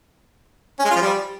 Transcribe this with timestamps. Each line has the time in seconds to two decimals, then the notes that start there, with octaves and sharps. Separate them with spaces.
0.79 C#4
0.85 G#3
0.90 F4
0.96 F3
1.01 G3